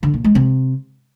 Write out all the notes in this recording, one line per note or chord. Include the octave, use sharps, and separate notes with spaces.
D3
A#2
G#3
C3